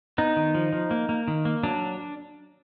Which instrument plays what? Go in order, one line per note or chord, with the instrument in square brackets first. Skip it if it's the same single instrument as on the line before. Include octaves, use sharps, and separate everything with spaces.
[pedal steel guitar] B3 D#4
D#3
F3
F3
A#3
A#3
D#3
A#3
F#3 D4